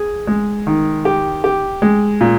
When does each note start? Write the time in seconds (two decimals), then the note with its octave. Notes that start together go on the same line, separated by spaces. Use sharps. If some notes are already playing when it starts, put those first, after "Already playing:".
Already playing: G#4
0.27 G#3
0.67 D#3
1.05 G4
1.44 G4
1.82 G#3
2.21 A#2